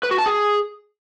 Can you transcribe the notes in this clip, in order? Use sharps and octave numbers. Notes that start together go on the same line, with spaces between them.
B4
F#4
A5
G#4